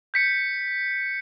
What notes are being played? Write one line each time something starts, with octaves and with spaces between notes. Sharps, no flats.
G6 B6 C#7